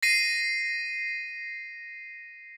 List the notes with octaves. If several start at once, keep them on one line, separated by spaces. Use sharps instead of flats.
A#6 C7 D#7